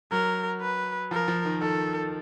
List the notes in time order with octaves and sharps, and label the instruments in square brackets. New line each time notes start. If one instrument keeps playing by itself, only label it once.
[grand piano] F#3 [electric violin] A#4
[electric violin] B4
[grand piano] F3 [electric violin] A#4
[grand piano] F3
D#3
[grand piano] D#3 [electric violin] A4